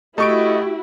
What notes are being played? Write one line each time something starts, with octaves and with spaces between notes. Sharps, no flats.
A3 E4 F#4 G4 D#5 C#6 D7